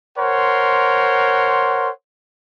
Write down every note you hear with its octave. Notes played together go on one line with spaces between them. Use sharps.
A#4 C5 C#5 F#5 C6